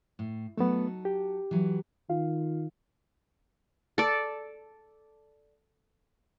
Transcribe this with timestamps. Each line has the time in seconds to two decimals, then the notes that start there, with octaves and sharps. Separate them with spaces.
0.19 A2
0.57 F#3 A3 B3 D#4 A4
1.05 G4
1.51 E3 F#3
2.09 D#3 F4 F5
3.98 A4 D5